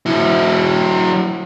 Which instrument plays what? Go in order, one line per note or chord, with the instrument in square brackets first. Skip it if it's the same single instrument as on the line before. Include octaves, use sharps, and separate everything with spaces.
[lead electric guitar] F#3 E4